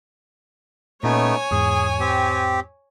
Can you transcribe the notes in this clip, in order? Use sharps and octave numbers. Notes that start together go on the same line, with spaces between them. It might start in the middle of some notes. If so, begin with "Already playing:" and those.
A#2 A3 B3 C#4 D#4 C#5 G#5
E2 G#2 G#4
C4 G4